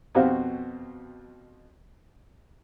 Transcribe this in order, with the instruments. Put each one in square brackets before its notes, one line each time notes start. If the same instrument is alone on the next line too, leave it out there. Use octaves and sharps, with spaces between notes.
[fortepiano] F2 B2 F#4 G4 C5 F5